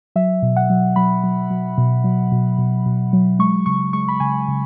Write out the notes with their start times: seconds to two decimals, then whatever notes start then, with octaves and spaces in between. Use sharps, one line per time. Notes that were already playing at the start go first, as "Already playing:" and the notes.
0.16 F#3 E5
0.42 B2
0.56 F#5
0.70 F#3
0.96 F#3 B5
1.24 F#3
1.50 F#3
1.78 B2
2.04 F#3
2.32 B2
2.58 B2
2.86 B2
3.13 F#3
3.39 G#3 C#6
3.66 C#3 C#6
3.93 G#3 C#6
4.08 B5
4.20 C#3 G#5
4.48 C#3